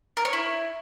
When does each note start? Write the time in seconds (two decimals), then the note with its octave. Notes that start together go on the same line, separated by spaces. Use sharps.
0.17 A#4
0.25 C#5
0.33 E4